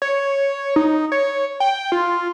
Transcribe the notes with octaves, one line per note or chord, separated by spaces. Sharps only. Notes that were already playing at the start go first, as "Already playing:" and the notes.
C#5
D#4
C#5
G5
F4